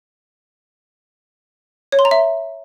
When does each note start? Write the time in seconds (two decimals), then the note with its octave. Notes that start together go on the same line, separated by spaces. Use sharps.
1.92 C#5
1.99 C6
2.05 A#5
2.11 E5